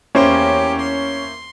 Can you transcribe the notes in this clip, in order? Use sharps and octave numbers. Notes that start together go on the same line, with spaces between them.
E2 A#3 C#4 E4 G4 C5
C6